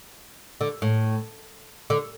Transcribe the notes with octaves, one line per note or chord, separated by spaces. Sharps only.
D3
A2
D3